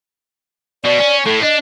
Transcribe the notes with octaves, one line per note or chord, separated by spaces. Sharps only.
B2 D5
C#4
A2 A4
D4 D#5